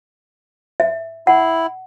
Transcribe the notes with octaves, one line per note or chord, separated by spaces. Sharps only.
E5
E4 F#5